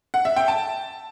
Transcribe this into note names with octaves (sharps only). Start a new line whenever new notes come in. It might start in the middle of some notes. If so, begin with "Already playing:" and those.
F#5
E5
G5
A5